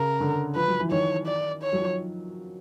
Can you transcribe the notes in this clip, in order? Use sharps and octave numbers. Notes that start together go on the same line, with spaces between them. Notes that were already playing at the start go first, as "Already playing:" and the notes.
Already playing: C#3 A#4
D3
F3 B4
F#3
E3
D#3 C#5
D5
C#5
F#3
F3